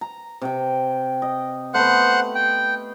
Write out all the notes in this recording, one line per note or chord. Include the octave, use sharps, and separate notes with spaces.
A#5
C3 G5
D#5
A3 B3 C5 F#5 F#6
G5